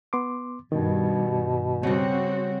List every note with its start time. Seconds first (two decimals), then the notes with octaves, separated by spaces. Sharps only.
0.13 B3 C6 D6
0.72 G2 B2 D#3
1.83 C#3 G3 C4 F#4